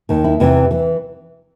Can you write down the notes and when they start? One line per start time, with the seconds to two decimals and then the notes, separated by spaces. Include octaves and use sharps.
0.09 D#2 D#3
0.24 E4
0.40 E2 C3 E3
0.71 E3